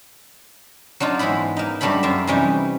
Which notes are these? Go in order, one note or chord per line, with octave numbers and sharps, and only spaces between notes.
F#3 D4 D#4 F4
G#2 E3 B3 E4 B5
A#3 D#4
G2 F#3 G3 A3 A4 B5
F#2 F4 E5
C3 E3 G3 C#4 D#4